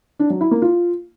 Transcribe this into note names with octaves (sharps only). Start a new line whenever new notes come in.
D4
F#3
E4
A#3
F4